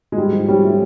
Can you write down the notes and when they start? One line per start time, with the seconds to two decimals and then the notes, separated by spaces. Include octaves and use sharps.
0.12 G#3
0.17 G#2 G3
0.33 F3
0.48 G3 C#4
0.64 A3